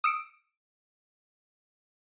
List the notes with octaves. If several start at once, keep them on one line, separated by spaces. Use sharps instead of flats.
D#6 E6 C#7 D7